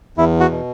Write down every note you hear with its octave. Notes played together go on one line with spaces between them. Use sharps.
E2 E4
F#4
B2